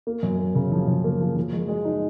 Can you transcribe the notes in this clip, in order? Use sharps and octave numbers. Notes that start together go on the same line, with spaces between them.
A#3
F#2
A#3
C#3
F3
C#3
A#3
F3
F3
G#3
G#3
D#4